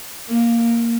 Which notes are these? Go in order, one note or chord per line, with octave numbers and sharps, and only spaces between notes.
A#3